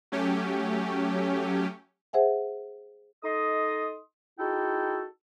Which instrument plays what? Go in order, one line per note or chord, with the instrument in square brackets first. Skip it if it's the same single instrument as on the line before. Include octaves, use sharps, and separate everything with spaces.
[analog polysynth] F#3 A3 C#4 G4
[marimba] G#4 C5 E5 F#5 G#5
[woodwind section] D#4 A4 D#5 C6 D#6
D#4 E4 F#4 G#4 A4 G5